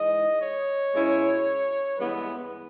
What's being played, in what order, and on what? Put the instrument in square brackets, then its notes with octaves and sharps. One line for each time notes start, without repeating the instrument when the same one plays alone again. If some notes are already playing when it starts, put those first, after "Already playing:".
Already playing: [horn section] G#2 E3 G#3 D#5
C#5
B2 G#3 C#4 E4
G2 E3 G#3 B3 E4 B4